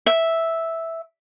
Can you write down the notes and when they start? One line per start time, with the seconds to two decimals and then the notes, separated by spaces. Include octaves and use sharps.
0.06 E5